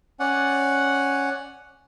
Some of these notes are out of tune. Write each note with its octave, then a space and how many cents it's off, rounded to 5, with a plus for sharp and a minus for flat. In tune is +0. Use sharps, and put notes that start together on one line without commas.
C#4 +0 D5 -5 F#5 +0